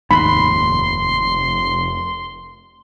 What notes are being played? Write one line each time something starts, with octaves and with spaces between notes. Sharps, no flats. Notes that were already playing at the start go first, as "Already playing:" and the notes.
F1 D#2 G#2 B5 C6